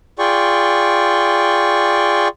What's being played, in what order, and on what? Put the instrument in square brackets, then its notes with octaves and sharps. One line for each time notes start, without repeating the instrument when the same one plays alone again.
[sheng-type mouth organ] F4 G#4 D5 G5 C#6